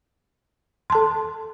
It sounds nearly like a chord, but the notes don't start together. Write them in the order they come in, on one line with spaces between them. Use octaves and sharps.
C6 A5 A4